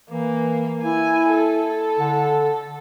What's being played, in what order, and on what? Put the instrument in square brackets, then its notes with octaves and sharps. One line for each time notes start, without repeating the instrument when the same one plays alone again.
[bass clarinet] E3 [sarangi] A#3
[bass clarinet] E4 [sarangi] G#5
[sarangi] A4
[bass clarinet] D3